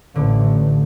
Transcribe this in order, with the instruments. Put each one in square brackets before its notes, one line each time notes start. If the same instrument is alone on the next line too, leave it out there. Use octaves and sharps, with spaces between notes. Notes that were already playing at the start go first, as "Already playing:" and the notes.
[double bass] A1 [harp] D3